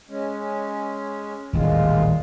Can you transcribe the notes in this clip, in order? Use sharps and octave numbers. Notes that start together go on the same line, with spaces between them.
G#3 C#4
D#1 A1 A#2 G#3 F4